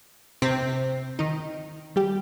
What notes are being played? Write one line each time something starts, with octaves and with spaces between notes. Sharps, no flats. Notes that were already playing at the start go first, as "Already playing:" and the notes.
C3 C4
D#3 D#4
G3 G4